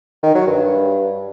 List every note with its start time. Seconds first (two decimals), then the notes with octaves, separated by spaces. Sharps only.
0.23 D#3
0.35 F#3
0.47 G2